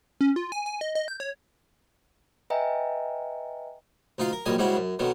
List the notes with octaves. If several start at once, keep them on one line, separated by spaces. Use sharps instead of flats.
C#4
F4
G#5
G#5
D#5
D#5
G6
C#5
B4 D#5 E5 G5 G#5 A#5
D2 D#4 F4 F5
A#4
A#1 F#2 D#3 G3 D#5 G#5
G#2 C#3 G3 G#3 E4 F#4
F#2
B2 D3 D#3 F#3